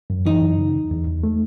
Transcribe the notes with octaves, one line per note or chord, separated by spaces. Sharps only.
F#2
E3 D#4
F#2
C#3
E2
E2
E2
A3